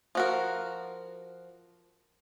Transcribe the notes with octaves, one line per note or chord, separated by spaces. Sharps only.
F3 F#4 A#4